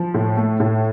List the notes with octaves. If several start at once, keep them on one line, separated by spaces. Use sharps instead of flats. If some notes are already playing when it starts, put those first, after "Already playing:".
Already playing: F3
A2
A3
A2